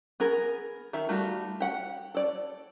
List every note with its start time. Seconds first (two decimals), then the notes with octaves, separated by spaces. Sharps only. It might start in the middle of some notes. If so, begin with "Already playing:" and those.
0.20 B3 G#4 A#4
0.93 D#3 A4 E5
1.09 G3 A3 D#4 F4 F#4
1.60 G4 F#5
2.15 A4 D5